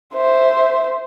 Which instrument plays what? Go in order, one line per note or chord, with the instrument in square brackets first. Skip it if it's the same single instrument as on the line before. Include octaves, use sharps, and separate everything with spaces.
[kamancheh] C5 E5